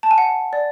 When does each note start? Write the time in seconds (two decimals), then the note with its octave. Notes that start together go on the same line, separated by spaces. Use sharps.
0.03 A5
0.11 G#5
0.18 F#5
0.53 D5